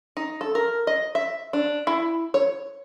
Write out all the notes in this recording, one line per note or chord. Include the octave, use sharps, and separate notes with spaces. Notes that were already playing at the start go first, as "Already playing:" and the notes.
D#4
A4
A#4
D#5
E5
D4
E4
C#5